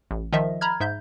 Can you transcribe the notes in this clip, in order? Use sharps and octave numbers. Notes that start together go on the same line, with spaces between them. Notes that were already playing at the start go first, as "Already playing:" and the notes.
A1
D#3 F3 D#5 E5
A#5 B5 F6 G#6
G#2 E5 G6